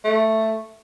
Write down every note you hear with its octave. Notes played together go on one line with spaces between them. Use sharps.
A3